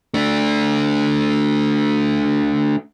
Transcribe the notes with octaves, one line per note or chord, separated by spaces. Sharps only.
A3 D4